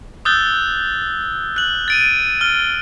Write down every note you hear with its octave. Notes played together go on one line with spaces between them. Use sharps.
D#6 E6 F#6 G6 A6 G7
F#6 F#7
A6 D7 D#7
F6 G7